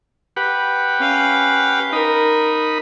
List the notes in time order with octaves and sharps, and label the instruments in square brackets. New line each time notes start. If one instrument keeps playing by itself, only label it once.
[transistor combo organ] G4 B4 F#5
[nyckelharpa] C#4 F5
[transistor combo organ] D#4 B5 [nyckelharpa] A#4